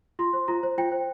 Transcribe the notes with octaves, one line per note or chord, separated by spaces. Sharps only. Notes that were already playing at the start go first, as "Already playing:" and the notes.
F4 C6
C5
F4 A#5
C5
F4 G5
C5